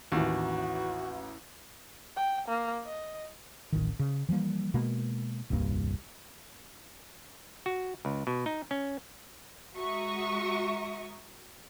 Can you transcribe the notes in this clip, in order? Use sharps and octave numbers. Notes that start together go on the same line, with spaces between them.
A1 D#2 E3 F#4
G5
A#3
D#5
D1 A1 D#3
C#3
E3 F3 G3 A#3
B2 G#3 A#3
D#1 C2 G2 A#3
F#4
C#2
B2
D#4
C#4
G#3 F#4 E5 A#5 C#6 D#6